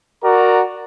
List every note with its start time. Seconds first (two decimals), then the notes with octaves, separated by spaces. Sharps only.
0.24 F#4 A#4 D5 A#5